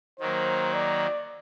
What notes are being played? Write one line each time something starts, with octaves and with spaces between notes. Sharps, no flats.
D#3 F#3 A#3 C5
D5